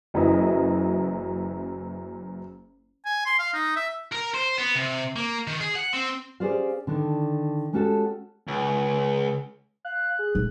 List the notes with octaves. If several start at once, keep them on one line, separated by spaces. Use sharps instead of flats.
F#1 F#2 E3 E4 D#5
G#5
C6
F5
D#4
E5
A#4
C5
B3
C3
A#3
D#3
G#4
F#5
C4
C#4 G4 G#4 C5 D5 F5
D3 D#3 D4
G#3 A3 C#4 F#4 G4 A4
C#2
F5 F#6
G#4
D#1 G#3